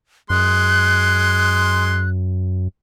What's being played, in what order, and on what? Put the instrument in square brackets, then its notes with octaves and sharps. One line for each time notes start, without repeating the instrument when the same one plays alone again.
[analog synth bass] F#2 [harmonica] G#3 C6 [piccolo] F#6